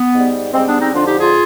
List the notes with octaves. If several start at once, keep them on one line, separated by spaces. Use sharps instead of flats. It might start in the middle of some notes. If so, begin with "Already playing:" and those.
Already playing: B3
G#2 G3
G#2 G3 G#3 C4
B3 D4
C4 D#4
F2 D3 F3 D4 F4
D#4 G4
F4 G#4